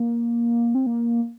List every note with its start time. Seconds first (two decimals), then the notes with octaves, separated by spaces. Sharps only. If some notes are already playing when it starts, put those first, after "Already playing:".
Already playing: A#3
0.75 C4
0.86 A#3